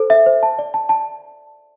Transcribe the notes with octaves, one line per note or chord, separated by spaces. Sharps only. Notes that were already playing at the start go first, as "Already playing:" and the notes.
Already playing: A4 C5
E5
C5
A5
D5
A5
A5